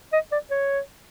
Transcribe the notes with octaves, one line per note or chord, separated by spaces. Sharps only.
D#5
D5
C#5